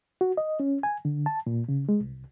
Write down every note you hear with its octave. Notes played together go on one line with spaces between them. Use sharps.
F#4
D#5
C#4
G#5
D3
A5
A#2
C#3
G#3
C2